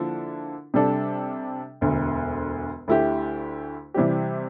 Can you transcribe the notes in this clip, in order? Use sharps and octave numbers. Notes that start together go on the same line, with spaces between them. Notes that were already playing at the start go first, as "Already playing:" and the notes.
Already playing: D3 F3 A#3 E4 A4
C3 G3 D4 A4
E1 D2 D3
D2 D3 A3 E4 G4
C3 E3 G3 C4 G4